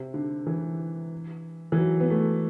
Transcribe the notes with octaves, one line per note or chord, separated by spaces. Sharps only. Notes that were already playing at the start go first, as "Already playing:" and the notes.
Already playing: C3
D3
E3
E3
F#3
B3
A3